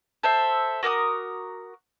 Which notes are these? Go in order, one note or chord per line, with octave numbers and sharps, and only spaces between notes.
A4 C5 E5
F#4 A#4 D6 D#6